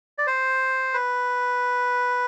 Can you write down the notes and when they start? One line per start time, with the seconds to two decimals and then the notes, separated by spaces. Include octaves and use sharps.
0.18 D5
0.27 C5
0.94 B4